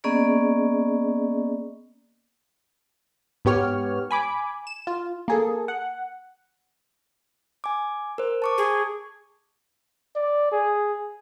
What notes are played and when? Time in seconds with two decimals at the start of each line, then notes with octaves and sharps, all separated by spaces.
0.04 A#3 B3 C#4 G#4 D5 D#5
3.45 G#2 B3 G4 C#5 F6
4.11 G#5 B5 D6
4.67 E7
4.87 F4
5.28 A#3 G#4 A4
5.68 F#5
7.64 G#5 D6
8.18 A#4 C5
8.42 A5 C#6 D6
8.58 G#4
10.15 D5
10.52 G#4